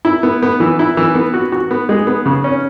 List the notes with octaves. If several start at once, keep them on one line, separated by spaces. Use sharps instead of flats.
E4
B3
B3
E3
E4
E3
B3
F#4
F#4
B3
G#3
B3
C#3
C#4